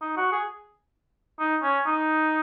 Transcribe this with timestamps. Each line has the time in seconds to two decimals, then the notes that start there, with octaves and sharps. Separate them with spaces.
0.01 D#4
0.17 F#4
0.32 G#4
1.39 D#4
1.62 C#4
1.86 D#4